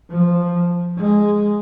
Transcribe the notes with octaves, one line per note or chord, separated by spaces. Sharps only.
F3
G#3